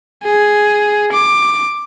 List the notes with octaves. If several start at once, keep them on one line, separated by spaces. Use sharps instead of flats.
G#4
D6